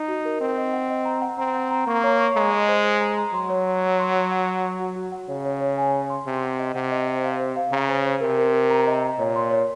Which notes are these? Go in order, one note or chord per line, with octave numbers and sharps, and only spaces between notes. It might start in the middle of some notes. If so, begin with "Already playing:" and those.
Already playing: D#4
F#4
A#4
C4 D#5
D#5
F#5
D#5
A#5
F#5
C4 A#5
F#5
A#5
A#3 C#6
C#5
C#6
G#3 A#5
D#5
C5
C5
A#5
A#5
F#3 C6
C#5
C6
C#5
C6
C6
F#5
F#5
C#6
F#4
F#4
F#5
C#3 C#5
C#5
C#5
G#5
G#5
C6
C3 C6
F#5
D#5
C3 F#5
D#5
C5
F5
C5
F5
C#3 A#5
C5
C5
C3 A#4
A#4
A#4
A#5
D#5
A#5
A#2 C#5
C6
C#5